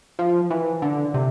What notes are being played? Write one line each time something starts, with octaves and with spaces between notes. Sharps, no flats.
F3
E3
D3
C3